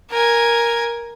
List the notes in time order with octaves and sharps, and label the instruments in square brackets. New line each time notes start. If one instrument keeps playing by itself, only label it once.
[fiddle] A#4 G#5